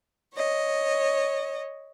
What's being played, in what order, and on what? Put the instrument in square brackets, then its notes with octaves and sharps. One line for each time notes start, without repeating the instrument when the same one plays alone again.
[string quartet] C#5 D#5